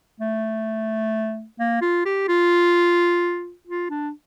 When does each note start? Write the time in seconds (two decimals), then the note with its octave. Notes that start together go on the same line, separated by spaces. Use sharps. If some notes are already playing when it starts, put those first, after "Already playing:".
0.21 A3
1.59 A#3
1.81 F4
2.06 G4
2.28 F4
3.67 F4
3.90 D4